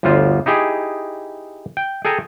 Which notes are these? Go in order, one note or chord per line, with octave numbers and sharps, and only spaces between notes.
G1 D2 D3 F4 C5
D#4 E4 G4 G#4
G5
G#4 A4 G5 G#5 A#5